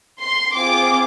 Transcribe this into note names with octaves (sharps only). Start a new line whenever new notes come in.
C6
C4 F4 G#4 D6